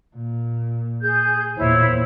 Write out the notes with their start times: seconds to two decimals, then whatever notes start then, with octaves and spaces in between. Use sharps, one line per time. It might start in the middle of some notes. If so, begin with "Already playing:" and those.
0.15 A#2
1.02 G#4 G6
1.57 E2 A#2 E4 C5 C#5